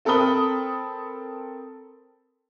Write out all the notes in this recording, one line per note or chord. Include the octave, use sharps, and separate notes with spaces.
C4 A4 A#4 B5 D#6 G7